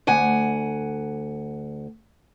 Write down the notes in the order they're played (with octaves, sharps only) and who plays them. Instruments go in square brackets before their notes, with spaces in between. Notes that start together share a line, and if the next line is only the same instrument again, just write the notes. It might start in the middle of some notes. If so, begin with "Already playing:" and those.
[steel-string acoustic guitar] D2 F#5 G#5